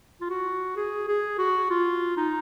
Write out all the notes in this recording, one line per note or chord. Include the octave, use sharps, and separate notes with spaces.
F4
F#4
G#4
G#4
F#4
F4
D#4